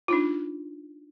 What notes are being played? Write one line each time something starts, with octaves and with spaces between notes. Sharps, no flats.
D4 D#4 F4